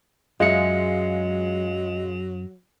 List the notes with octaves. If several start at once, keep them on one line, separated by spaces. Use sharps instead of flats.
F#2 F#3 G#3 F4 D#5 E5 C#7